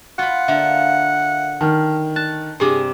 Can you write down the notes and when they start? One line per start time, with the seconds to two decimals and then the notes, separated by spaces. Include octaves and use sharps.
0.19 F4 F#5 B5
0.48 D3 A#3 E5 F5
1.61 D#3 A5 F6
2.16 A5 F#6
2.60 G2 C3 G4 G#4 D6